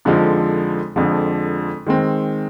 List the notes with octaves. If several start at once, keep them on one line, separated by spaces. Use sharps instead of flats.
F2 D3 F3 G#3 D#4
F2 D3 F3 G#3
D#3 G#3 C4